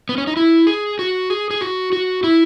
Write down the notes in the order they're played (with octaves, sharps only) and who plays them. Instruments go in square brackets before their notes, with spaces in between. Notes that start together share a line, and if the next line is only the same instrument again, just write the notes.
[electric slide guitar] B3
C#4
D#4
E4
G#4
F#4
G#4
G#4
F#4
F#4
E4